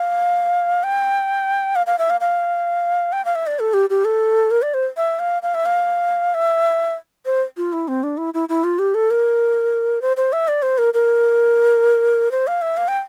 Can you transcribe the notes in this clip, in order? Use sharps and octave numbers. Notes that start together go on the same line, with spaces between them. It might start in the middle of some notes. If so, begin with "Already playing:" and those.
Already playing: F5
G5
F5
F5
E5
F5
F5
G5
F5
E5
D5
A4
G4
G4
A4
A#4
D5
C5
E5
F5
F5
E5
F5
E5
C5
F4
E4
C4
D4
E4
E4
E4
F4
G4
A4
A#4
C5
C5
E5
D5
C5
A#4
A#4
C5
F5
E5
F5
G5